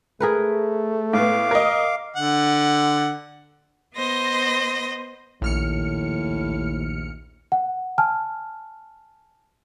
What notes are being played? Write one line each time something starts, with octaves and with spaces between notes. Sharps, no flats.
A3 G#4 A#4 B4
A2 B3 F5 D6
A#4 D#5
D3 F#5
B3 C5 D#5 A#6
A#1 D#2 A2 F6 C#7
F#5
G#5 A5 F6